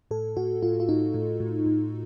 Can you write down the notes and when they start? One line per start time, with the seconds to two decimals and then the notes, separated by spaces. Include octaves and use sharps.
0.11 A2 A4
0.37 A2 F#4
0.63 A2 F4
0.80 F4
0.89 A2 D#4
1.14 A2
1.40 A2
1.66 A2